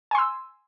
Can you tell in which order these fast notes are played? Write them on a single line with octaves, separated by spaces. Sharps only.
G#5 C6 E6